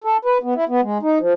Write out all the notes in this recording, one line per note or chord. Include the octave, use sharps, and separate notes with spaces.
A4
B4
B3
E4
B3
G#3
D#4
F3